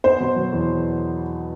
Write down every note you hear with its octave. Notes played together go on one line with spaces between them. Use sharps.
B3 C5
B2
F#3
E2